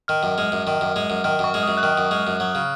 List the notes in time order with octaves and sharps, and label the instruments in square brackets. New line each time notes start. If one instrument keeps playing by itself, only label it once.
[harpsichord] D#3 [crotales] F6
[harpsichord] F#2
G#3
F#2
D#3
F#2
G#3
F#2
[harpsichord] D#3 [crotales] F6
[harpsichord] F#2 [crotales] C#6
[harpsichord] G#3
[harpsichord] F#2 [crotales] D#6
[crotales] F#6
[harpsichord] D#3 [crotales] F6
[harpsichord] F#2
G#3
F#2
F#3
C#3